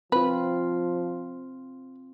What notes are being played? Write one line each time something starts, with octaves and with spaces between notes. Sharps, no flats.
F3 C4 F4 B4